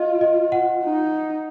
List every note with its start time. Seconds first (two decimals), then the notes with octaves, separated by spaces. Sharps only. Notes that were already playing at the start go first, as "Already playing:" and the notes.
Already playing: F4 D#5 F5
0.21 D#5
0.52 F#5
0.84 D#4